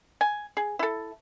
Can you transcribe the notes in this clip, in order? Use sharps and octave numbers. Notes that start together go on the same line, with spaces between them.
G#5
G#4
E4 A4